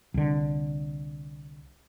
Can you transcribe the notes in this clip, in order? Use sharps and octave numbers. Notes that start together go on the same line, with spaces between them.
C2 D3